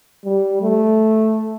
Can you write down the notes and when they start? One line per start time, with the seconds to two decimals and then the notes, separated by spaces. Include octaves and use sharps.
0.25 G3
0.63 A3